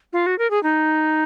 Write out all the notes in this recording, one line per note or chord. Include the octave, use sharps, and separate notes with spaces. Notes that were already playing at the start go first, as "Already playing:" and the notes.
F4
F#4
A#4
G#4
D#4